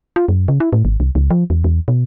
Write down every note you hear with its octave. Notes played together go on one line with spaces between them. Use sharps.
F4
F#2
C#3
E4
A2
G#1
C2
C#2
F3
E2
E2
B2